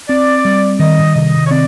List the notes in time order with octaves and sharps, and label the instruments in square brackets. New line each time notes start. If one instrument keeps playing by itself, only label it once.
[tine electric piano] C4 [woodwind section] D5
[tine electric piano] G3
[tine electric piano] D#3 [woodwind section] D#5
[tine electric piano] C3 [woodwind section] D#5
[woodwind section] C#5
[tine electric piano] C4 [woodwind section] D5